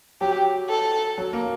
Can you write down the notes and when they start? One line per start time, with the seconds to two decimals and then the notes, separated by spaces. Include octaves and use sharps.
0.21 F#3 G4
0.69 A4
1.18 F#3
1.33 A#3